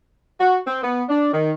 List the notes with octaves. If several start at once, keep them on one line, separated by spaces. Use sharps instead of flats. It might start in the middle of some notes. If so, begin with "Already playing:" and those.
F#4
C4
B3
D4
D#3